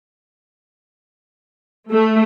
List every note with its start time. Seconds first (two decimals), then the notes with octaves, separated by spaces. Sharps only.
1.90 A3